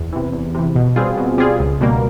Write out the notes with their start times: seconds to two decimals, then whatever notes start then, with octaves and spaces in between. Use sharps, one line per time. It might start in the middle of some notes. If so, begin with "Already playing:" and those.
Already playing: E2
0.13 C3 E3
0.33 E2
0.55 C3 E3
0.76 B2
0.96 G3 C4 F4 G#4
1.17 B2
1.38 G3 C4 F4 G#4
1.59 C#2
1.81 B2 G3 A#3